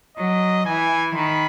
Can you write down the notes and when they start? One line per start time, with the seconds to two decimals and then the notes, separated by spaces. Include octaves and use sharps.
0.17 F#3 D#5
0.66 E3 G#5
1.15 D#3 B5